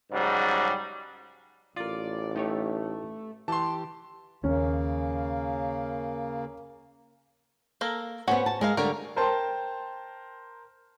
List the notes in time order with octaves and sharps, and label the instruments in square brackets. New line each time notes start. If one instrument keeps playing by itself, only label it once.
[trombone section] G#2 C#3 F#3 G3
[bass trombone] A1 [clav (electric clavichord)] F4 A#4 [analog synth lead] D5
[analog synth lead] A3 [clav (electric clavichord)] D#4 G4 C#5
[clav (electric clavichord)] E3 [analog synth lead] G4 [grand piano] A5 C6
[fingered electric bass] D#2 [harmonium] C#3 A#3 [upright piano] C#4
[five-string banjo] A#3 A4 A#4
[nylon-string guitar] B3 C5 F#5 [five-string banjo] C#4 F#4
[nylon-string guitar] A5
[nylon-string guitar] G#3 [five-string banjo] G#4 A#4 F5
[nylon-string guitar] D3 G3 [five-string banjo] A#4 C#5
[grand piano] A#4 C5 G5 A5 C6